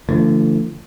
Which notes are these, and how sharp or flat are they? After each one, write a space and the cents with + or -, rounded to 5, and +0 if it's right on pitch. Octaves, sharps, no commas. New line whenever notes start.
D3 -10 F3 -40 A3 +20